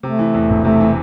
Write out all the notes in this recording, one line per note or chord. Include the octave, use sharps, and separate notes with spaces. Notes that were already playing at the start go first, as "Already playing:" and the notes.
C3 A3
E3
E2
E1
C3 A3
E3